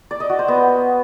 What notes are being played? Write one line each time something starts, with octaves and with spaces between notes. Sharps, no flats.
D5
D#5
F#4
C5
B3